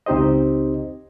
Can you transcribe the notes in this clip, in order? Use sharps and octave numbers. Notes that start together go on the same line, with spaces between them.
C#2 C4 D#4 G4 C5 D#5